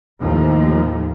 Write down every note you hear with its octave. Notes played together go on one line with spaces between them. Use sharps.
D#2 A2 D#3 F3